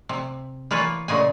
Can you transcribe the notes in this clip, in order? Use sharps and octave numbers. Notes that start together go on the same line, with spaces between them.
C3
E3 A#3 F4 B4 C#5
A#2 C#3 G#3 G#5